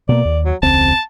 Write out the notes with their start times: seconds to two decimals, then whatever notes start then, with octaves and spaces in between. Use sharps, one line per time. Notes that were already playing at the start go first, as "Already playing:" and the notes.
0.09 B2 A#3 D5
0.25 D#2
0.45 F#3
0.62 E1 C#2 C4 A5